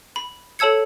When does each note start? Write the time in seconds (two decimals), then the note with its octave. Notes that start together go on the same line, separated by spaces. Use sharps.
0.16 B5
0.59 A4 C#5 A5 E6 G#6 C#7